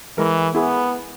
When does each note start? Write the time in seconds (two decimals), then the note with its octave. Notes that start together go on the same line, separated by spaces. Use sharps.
0.18 E3 G#3 A#4
0.55 B3 E4 G#4